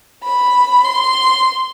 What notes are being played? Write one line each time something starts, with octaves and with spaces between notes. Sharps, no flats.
B5
C6